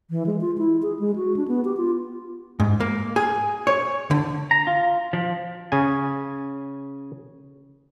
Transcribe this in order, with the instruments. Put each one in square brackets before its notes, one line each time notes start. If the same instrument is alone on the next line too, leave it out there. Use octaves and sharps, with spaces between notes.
[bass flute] E3
G#3
F4
E4
G#4
G#3
F#4
D4
B3
G4
F4
[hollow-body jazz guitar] G#2
A#3
G#4
C#5
D3
[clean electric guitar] A#5
F4
F3
[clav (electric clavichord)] C#3 G#5